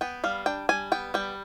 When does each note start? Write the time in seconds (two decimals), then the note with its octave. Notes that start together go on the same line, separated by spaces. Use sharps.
0.01 B3 G5
0.24 G3 F5
0.46 D4 G5
0.69 G3 G#5
0.92 B3 G5
1.14 G3 G5